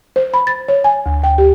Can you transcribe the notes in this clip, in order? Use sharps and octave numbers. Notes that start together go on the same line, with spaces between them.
C5
B5
A6
C#5
G#5
D2
G5
G4